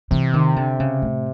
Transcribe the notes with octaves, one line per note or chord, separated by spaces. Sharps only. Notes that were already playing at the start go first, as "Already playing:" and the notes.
C3 E3
D#3
D3
C#3
A2